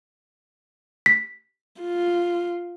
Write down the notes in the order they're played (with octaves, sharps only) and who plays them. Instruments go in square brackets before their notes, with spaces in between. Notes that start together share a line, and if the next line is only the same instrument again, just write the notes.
[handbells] B6
[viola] F4